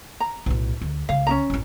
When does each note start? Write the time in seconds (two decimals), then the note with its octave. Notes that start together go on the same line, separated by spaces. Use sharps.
0.20 A#5
0.46 B1 A2
0.81 D2
1.09 C#2 C#3 F5
1.27 C#4 D#4 A#5
1.50 A1 F#2